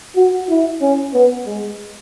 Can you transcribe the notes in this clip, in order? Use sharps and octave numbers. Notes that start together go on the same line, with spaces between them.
F#4
E4
C#4
B3
G#3